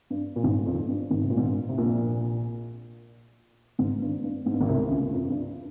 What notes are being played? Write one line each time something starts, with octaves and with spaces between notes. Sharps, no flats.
G2
A#2
G#1 G#2
F2
G2
G#1 G#2
C3
A#2
G#2
G2
C3
A#1 A#2
G#1 G#2
G2
G2
G#2
G2
G#1 G#2
C2 C3
C#2 C#3
F2
G2